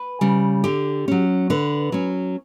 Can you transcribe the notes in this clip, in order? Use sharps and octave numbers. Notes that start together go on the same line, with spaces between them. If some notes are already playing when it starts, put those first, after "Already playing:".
Already playing: B4
C#3 G3
D3 G4
F#3 C#4
D3 B4
F#3 C#4